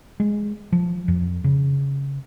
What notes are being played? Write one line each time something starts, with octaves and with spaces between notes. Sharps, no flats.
G#3
F3
F2
C#3